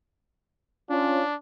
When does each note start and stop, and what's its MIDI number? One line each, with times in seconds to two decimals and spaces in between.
0.90 1.23 61
0.90 1.35 62
0.90 1.23 65